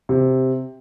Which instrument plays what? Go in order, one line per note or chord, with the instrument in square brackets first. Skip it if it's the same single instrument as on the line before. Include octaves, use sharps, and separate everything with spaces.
[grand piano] C3